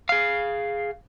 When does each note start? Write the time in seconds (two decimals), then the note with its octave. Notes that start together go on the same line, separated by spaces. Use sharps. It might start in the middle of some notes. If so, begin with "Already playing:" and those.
0.09 G#4 F5